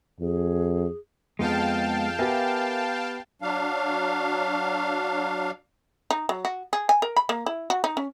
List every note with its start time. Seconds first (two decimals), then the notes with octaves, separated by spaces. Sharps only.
0.20 F2 G#4
1.39 F2 G#3 B3 G#4 F5 G5 A5 G6
2.19 B3 G4 A#4 E5 G#5
3.42 F#3 D4 F5
6.11 D#4
6.29 F#3
6.45 F#4
6.73 G#4
6.89 G#5
7.02 A#4
7.17 B5
7.29 A#3
7.46 E4
7.70 F#4
7.84 D#4
7.97 C#4